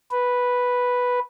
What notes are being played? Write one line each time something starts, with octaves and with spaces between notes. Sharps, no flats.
B4